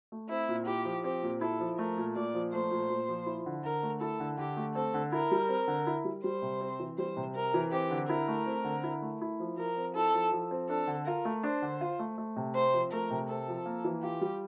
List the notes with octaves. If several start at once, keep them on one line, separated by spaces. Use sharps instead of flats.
A3
C4 E4
A#2
E4 G4
F3
C4 G4
A#2
E4 A4
F3
A3 A#4
A#2
A#2 D5
F3
A3 C5
A#2
A#2
F3
E4
D3
D3 A#4
A3
E4 A4
D3
D3 G4
A3
C4 A4
D3
E4 A#4
G3
C4
D3
E4
G3
G3 C5
C3
C4
E3
G3 C5
C3
C4 A#4
E3
C4 G4
D3
E4 A#4
A3
C4
D3
E4
A3
E4
F3
F3 A#4
C4
E4 A4
F3
F3
C4
D4 A4
D3
F4 A#4
A3
D4 C5
D3
F4
A3
A3
C3
C4 C5
F3
A3 A#4
C3
C4 A4
F3
A#3
E3
F4 G4
G3